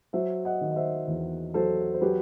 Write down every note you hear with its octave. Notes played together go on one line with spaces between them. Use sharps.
F#3 C5 E5
D#5 F#5
D#3
D#5
C5 E5
E2
F#3 A4 C5
C5
F#3 G4 B4